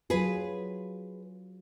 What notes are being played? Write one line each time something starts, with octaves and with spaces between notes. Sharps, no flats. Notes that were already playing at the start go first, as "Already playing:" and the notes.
F#3 F4 G#4 B4